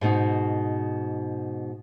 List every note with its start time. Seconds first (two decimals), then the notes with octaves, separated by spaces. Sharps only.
0.01 G#2 B2 D#4